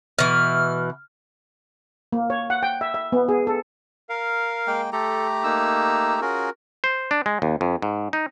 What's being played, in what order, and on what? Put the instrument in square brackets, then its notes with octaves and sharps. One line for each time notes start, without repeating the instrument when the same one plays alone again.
[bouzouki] B2 E3 [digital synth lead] F6
[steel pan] A#3
C#5
F#5
G5
E5
E5
B3
G#4
A4
[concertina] A#4 F5
[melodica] G#3 A#3 G5
[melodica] A3 G4 A#5 [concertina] A4
[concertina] A#3 D#4 E6
[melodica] C#4 F4 G#4 [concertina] F#4 A#4
[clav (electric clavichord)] C5
D4
G#3
D#2
F2
G#2
D#4